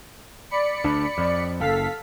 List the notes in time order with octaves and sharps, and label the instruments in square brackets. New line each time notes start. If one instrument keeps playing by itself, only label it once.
[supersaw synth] D5 B5 C#7
[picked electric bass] D2 D4
F2
[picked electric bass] F#1 [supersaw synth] A4 F5 B6